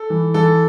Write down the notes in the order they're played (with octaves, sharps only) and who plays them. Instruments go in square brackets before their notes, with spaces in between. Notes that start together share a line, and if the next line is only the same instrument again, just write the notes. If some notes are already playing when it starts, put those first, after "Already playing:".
Already playing: [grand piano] A4
[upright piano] E3
[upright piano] E3 [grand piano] A4